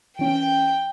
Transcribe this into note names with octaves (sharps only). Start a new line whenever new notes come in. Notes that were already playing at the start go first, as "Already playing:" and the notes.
E3 C#4 G5